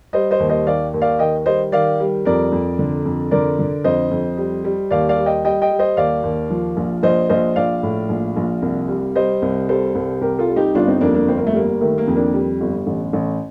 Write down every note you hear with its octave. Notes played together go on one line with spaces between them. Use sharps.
G3 C5 D#5
C5 D#5
D#2
C5 D#5
D#3 D5 F5
D#2
D5 F5
D#3 D#5 G5
G3 C5 D#5
D#3 D5 F5
G3
F2 A#4 D5
F2
D3
F2
D3 A#4 D5
D3
F2 C5 D#5
F2
G3
G3
D#2 D5 F5
D5 F5
G3
D#5 G5
G3 D#5 G5
D#5 G5
G3
C5 D#5
D#2 D5 F5
D#2
F3
A#1
A#1 C5 D#5
A#1 C5 D#5
A#1 D5 F5
A2
A#1
A#1
C2
G3
G3 C5 D#5
C2
G3 A4 C5
C2
C2 G4 A#4
F4 A4
G3
D#4 G4
G1 D4 F4
C4 D#4
F2 A#3 D4
A#3 D4
G1 C4
A#3
A3
G3 A#3
D#3 A3
A#3
F2
A#3 D4
G3
G1
A1
A1